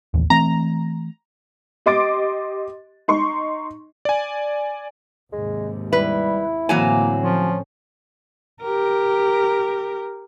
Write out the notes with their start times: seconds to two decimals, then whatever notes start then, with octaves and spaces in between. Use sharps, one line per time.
0.14 A1 D#2
0.30 E3 A3 C4 A#5
1.86 G4 D#5 C6 D6 A6 D7
3.08 D#4 C6 C#6
4.05 D5 G#5
5.33 D#2 G#2 C3 G#3
5.93 G3 E4 B4
6.69 A2 D3 E3 F#3 A#3 C4 G#5
7.22 F3 C#4
8.63 G4 A#4